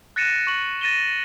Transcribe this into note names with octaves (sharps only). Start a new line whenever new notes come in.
F#6 A6 A#6 C#7 D#7 E7
C#6 F#7
A6 A#6 D#7 E7 G7